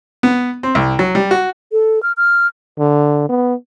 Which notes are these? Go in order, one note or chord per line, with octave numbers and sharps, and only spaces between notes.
B3
C4
C2
F#3
G3
F#4
A4
F6
F6
D3
B3